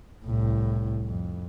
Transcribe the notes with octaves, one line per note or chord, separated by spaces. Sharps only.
C2 A2
F2